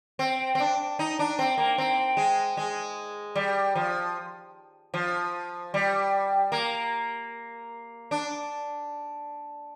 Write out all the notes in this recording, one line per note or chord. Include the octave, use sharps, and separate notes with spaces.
C4
C4
D4
D#4
D4
C4
A#3
C4
G#3
G#3
G3
F3
F3
G3
A#3
D4